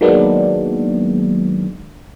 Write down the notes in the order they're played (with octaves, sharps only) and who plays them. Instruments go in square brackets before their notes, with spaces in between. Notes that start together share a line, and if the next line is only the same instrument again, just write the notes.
[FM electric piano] D#3 F#3 G#3 A#3 B3 D4